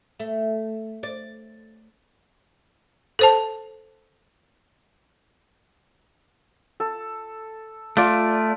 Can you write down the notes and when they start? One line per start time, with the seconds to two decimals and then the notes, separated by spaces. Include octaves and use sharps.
0.20 A3
1.03 D5
3.19 A4 C5 A5
6.80 A4
7.97 A3 F4 D5